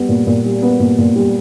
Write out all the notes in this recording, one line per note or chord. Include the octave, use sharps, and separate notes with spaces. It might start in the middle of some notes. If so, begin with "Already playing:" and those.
Already playing: G3 B3
A#2
A#2
G3
B3
A#2
A#2
G3